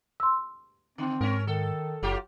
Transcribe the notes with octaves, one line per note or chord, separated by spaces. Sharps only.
C6 E6
D3 C4
G#2 C#4 A#4
D#3 A4
F#1 F#3 F4 G4